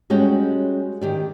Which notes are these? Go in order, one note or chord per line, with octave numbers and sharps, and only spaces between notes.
G3 G#3 C#4 F#4 C#5 G5
D#3 G4 D5